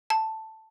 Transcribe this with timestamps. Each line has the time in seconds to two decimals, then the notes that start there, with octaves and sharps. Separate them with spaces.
0.10 A5